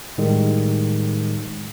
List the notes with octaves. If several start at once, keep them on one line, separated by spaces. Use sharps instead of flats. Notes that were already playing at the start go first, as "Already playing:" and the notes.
A2 D#3 G3 G#3